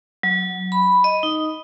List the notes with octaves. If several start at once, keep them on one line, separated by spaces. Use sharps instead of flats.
F#3
B5
D#5
D#4